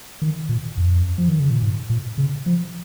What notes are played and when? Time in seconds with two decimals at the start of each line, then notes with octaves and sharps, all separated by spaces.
0.22 D#3
0.49 A#2
0.77 F2
1.18 F3
1.28 D#3
1.40 C#3
1.51 A#2
1.62 G#2
1.90 A#2
2.18 C#3
2.46 F3